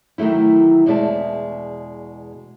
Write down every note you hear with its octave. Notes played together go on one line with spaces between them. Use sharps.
D#3 E3 F#3 A3 E4
E2 B2 G#3 D5 E5 A5